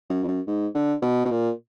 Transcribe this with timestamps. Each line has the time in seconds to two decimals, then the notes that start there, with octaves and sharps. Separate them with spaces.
0.10 F#2
0.24 F2
0.27 F#2
0.47 G#2
0.75 D3
1.02 B2
1.25 B2
1.31 A#2